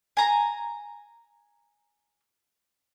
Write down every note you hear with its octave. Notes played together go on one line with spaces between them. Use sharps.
G#5 A#5